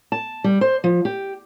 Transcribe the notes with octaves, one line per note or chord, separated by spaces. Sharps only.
A5
G3
C5
F3
G4